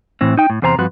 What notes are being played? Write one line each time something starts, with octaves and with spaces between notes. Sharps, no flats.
A2 E3 C4
D#4 G5
A2
E2 C3 C5 G#5 A#5
G2 F3 C4 F#4 B4